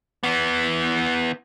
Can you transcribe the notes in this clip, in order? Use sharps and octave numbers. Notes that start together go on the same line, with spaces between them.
E3 B3